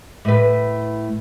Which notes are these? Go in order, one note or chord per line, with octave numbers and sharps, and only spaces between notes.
A2 B4